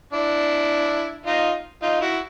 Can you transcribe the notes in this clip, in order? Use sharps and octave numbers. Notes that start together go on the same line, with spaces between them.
D4 E4
D#4 F4
D#4 F4
E4 F#4